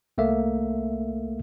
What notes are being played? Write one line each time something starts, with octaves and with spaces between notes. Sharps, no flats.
C2 A3 A#3 E5